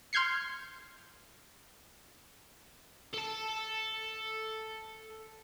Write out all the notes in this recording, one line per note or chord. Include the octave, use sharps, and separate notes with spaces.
C6 F6 G6 G#6 C7 C#7
A4 A5